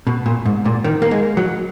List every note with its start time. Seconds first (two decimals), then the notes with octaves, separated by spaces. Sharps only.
0.07 B2
0.26 A#2
0.46 G#2
0.65 A#2
0.84 D#3
1.02 A#3
1.11 G#3
1.37 F#3